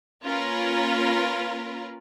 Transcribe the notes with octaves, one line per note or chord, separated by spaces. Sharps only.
A#3 C#4 F4 A#4 B4